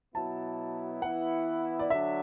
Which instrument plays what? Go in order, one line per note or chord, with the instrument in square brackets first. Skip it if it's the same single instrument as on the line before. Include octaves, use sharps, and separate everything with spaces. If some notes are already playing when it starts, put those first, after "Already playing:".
[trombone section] B2 F#3 B3 E4 [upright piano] A5
[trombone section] E3 B3 E4 [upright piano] F#5
[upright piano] D5
[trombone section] D3 F#3 D4 [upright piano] E5